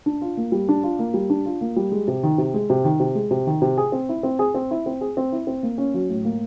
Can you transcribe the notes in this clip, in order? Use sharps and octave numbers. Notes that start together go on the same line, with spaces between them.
D4
F4
A#3
G3
D4
F4
A#3
G3
D4
F4
A#3
G3
G#3
C3
D#3
C3
G#3
C3
D#3
C3
G#3
C3
D#3
C3
G#4
C4
E4
C4
G#4
C4
E4
C4
G#4
C4
E4
C4
A#3
C#4
F#3
A2
A#3